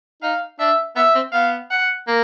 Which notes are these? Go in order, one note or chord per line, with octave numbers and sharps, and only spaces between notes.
D#4 F5
D4 E5
B3 E5
C4
B3 F5
F#5
A#3